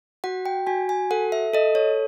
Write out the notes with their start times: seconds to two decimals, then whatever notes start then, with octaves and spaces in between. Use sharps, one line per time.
0.24 F#4 F#5
0.46 G5
0.67 F#4 G#5
0.89 G#5
1.11 A4 F#5
1.32 E5
1.54 A4 D#5
1.75 C#5